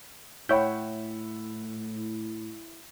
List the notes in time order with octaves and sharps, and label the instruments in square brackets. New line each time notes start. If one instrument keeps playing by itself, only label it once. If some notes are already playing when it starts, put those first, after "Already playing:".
[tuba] A2 [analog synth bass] E4 [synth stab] C#5 G5 [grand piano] E5 F#5 B5